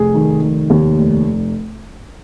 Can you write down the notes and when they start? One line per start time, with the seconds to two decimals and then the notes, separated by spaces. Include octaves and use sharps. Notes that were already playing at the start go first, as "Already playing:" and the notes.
Already playing: F1 G#4
0.14 D#3
0.42 F1
0.70 D#2
0.99 F1